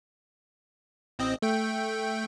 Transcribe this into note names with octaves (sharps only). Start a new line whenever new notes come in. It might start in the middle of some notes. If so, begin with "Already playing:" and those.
A1 C4 D#5
A3 G5